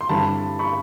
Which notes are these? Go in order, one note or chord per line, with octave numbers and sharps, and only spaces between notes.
C6
G2 D3 G3 C4 E4 A5 B5
B5 C#6